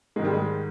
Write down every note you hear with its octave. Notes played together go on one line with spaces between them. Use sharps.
G#2 D#3 G#3
G3
G#3